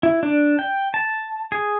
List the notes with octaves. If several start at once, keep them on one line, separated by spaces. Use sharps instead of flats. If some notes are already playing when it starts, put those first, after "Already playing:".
E4
D4
G5
A5
G#4